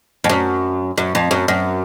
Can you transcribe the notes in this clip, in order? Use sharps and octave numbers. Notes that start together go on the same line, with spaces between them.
F2
F#2
F#2
F2
F#2
F#2